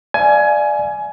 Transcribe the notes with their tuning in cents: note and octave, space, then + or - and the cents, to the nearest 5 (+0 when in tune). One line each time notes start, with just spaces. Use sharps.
D5 +15 F5 -40 G#5 +20